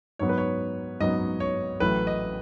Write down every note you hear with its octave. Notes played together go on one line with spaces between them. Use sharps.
G#2 F#3 B3 C#5
B4
C#5
G#2 F#3 B3 D#5
C#5
A1 A2 F#3 A3 B4
D#5